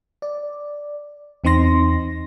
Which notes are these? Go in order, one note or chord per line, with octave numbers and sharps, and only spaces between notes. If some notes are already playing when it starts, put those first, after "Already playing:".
D5
E2 C4 D#4 C6 A#6